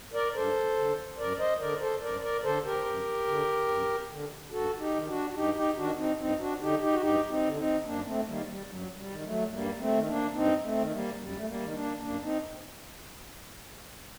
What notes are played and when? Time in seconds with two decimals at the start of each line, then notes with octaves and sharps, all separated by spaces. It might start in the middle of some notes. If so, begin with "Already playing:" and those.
0.14 A#4 D5
0.35 G2 A4 C5
0.77 D3
1.18 F#2 A#4 D5
1.39 C5 D#5
1.60 D3 A#4 D5
1.80 A4 C5
2.01 F#2 A#4 D5
2.23 A#4 D5
2.43 D3 A4 C5
2.65 G4 A#4
2.86 F#2
3.27 D3
3.68 F#2
4.11 D3
4.52 G2 F#4 A4
4.79 D#4 G4
4.94 D#3
5.07 D4 F#4
5.30 F#4
5.35 G2 D#4 G4
5.55 D#4 G4
5.76 D#3 D4 F#4
5.97 C4 D#4
6.18 G2 C4 D#4
6.39 D4 F#4
6.60 D3 D#4 G4
6.81 D#4 G4
6.92 F#4
7.01 G2 D#4 G4
7.29 C4 D#4
7.44 D3
7.57 C4 D#4
7.85 F#2 A#3 D4
8.06 A3 C4
8.26 D#3 G3 A#3
8.48 G3
8.69 F#2 F#3
8.96 G3
9.10 D#3
9.24 F#3 A3
9.51 G2 G3 A#3
9.79 A3 C4
9.94 D#3
10.07 A#3 D4
10.35 G2 C4 D#4
10.63 A3 C4
10.77 D#3
10.91 G3 A#3
11.18 F#2 G3
11.37 A3
11.46 G3 A#3
11.60 D#3
11.74 A#3 D4
12.01 F#2 A#3 D4
12.23 C4 D#4